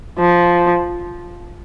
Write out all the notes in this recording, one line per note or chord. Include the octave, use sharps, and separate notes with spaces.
F3